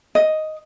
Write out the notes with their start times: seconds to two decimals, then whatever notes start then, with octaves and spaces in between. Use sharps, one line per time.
0.15 D#5